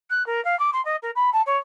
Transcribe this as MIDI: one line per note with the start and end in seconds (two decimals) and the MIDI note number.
0.10 0.25 90
0.26 0.43 70
0.44 0.58 77
0.59 0.70 86
0.73 0.84 84
0.85 0.96 75
1.02 1.11 70
1.15 1.30 83
1.33 1.41 81
1.46 1.57 73